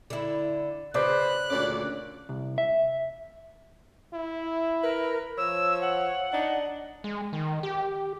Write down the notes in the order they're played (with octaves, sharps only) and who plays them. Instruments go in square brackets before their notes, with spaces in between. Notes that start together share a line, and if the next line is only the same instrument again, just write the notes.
[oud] D3 E4
[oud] C#3 [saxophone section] B4 C5 [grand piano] D5 D6 [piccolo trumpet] F#6
[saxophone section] D2 A#2 D5 [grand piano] C#4
[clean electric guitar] C2
E5
[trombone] E4
[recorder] A#4 [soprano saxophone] B4
[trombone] F3 [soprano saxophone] C#5 [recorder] E6
[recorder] F#5
[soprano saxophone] D4 [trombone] D#4
[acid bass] G#3
D#3
G4